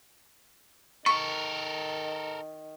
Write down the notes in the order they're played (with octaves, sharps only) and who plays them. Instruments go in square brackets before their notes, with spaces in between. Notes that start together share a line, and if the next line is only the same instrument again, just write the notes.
[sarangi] D#3 [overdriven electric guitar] A4 A#4 [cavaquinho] C#6